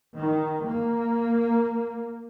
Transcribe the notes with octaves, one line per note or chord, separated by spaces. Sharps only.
D#3
A#3